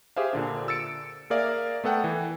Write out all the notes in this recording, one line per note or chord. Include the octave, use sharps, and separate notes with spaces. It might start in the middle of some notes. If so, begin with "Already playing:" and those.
G4 G#4 C5 E5 F5
A#2 D3 D4
E6 A6 C#7 D7
A#3 G#4 A#4 D5 E5 F5
A3 B3 A4 F#5 G5
E3